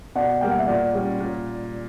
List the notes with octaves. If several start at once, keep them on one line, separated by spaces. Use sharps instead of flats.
B2 D5 F#5
G3 A#3 G5
F#5
E5
A#2 D5 F#5
G3 C#4
A#2